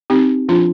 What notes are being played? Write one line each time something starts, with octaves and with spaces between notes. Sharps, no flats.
C4 D#4 G4
F3 D4 F4